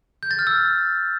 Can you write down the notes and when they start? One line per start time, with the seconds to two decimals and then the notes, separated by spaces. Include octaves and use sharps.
0.23 G6
0.31 A6
0.39 F6
0.47 E6